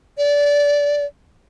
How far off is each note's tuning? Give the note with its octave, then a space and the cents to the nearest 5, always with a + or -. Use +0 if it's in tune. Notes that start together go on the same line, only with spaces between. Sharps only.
D5 -20